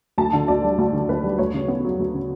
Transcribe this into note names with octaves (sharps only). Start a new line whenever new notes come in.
D2 A5
D3
D2 D5
G3
D2
D3
D2 B4
G3
D2 C#5
C#3
B3
F#3
D2
C#3